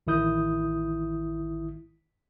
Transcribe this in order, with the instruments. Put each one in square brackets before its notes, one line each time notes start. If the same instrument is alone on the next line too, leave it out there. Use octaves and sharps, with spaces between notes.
[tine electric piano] A1 D#3 E4 D#6 G6